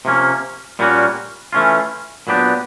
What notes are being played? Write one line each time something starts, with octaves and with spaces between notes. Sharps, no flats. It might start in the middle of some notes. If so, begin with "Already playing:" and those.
C3 F3 A#3 C#4
A#2 G3 A#3 C#4 F#4
E3 A3 C#4 F4
A#2 F#3 B3 D4 G4